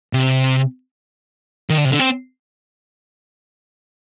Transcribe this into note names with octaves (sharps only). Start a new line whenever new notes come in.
C3
D#3
D3
C3
D3
C4